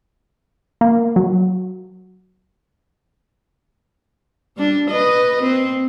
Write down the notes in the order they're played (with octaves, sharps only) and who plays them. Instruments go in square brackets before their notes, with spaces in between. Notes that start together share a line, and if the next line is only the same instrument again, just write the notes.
[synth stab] A#3
F#3
[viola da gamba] G3 D4
B4 D#5
C4